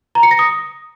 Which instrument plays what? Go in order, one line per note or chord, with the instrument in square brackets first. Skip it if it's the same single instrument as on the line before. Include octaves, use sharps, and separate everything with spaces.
[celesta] A#5
C#7
A#6
D#6